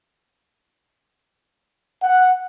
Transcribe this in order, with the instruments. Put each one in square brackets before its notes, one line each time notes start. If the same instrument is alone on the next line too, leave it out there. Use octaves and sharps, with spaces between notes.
[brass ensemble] F#5